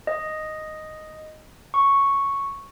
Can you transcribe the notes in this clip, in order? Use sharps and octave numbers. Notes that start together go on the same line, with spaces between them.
D#5
C#6